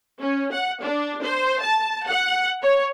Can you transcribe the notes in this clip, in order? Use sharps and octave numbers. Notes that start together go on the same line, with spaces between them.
C#4
F#5
D4
C5
A5
F#5
C#5